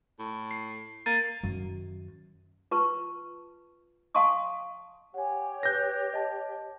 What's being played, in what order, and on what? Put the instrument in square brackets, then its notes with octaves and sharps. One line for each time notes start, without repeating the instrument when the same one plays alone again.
[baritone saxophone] A2
[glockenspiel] C7
[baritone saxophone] A#3 [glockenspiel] A6 C7 D#7
[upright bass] F#2 D#3
[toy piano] F4 B4 A5 C#6
F5 G#5 A5 C6 C#6 D#6
[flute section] G4 C#5 [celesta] F#5 G#5
[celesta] B4 F#6 [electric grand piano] G6 A#6
[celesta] D#5 A5